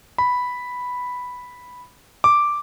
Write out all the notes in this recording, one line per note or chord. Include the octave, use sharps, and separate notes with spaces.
B5
D6